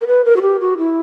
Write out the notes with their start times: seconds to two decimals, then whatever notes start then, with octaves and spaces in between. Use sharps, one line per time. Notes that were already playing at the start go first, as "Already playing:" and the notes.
0.01 A#4
0.07 B4
0.25 A#4
0.36 F#4
0.42 G4
0.60 F#4
0.78 E4